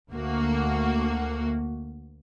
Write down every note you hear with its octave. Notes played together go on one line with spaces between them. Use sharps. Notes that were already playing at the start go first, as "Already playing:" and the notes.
D2 A#3 F#4